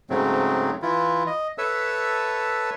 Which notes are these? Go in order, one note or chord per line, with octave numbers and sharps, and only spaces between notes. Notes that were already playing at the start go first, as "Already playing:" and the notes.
G#2 C#3 F#3 A3 C4
E3 E4 F4
D#5
A4 B4 C#5 E5 A5 E6